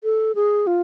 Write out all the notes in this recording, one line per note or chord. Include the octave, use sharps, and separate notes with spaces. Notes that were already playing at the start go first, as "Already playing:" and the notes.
A4
G#4
F4